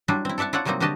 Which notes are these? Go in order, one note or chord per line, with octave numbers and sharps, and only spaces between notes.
F#3 G3 D4 E4 F4
C4 E4
A4 D5 E5 F#5 A5
E4 F4 A4 C#5 D5 F#5
C3 F#3 G3 A#3 C4 D#4
D3 G3 F#4 G4 D#5 A5